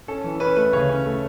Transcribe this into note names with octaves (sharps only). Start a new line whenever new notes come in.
C#4 A4
E3
C#4 B4
A3 B4
C#3 C#5
C#4
A3